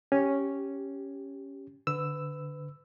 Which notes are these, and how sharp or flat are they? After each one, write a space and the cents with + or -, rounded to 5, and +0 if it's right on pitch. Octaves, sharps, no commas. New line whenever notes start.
C#4 +0 G4 +0
D3 +0 B4 +25 E6 +0